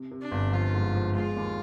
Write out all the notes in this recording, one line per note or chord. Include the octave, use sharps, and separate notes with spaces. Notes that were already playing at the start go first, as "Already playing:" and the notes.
Already playing: C3
C3
D4
G1
F3 F4
G#2
F3
G#3 F4
D#2